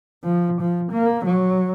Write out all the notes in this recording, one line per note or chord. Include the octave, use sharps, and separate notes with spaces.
F3
F3
A#3
F#3